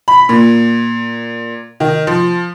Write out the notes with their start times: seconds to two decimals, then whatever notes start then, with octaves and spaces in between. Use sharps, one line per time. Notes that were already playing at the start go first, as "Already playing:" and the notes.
0.08 B5
0.29 A#2
1.80 D#3
2.07 F3